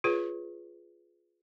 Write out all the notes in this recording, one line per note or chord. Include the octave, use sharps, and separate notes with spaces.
F4 G#4 B4 C#5